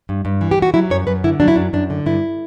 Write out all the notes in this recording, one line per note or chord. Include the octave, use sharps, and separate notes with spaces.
G2
G2
E3
G4
E3 F#4
F#3 E4
F#2 C#5
F#2 B4
D3 E4
F#3 D4
E4
F#2 D4
F#2 D4
D3
G2 E4